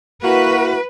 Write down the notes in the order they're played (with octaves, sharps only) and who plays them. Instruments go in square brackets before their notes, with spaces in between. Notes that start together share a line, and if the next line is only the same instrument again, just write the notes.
[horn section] A#3 E4 F#4 [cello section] B4